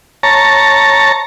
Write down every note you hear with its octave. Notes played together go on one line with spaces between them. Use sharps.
C#5 A5 A#5